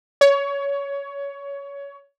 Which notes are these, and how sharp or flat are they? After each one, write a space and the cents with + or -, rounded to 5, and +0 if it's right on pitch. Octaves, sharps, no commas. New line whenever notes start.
C#5 +20